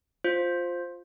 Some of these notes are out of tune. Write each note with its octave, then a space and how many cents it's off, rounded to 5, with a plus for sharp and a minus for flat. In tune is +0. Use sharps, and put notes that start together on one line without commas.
F4 +10 C5 +0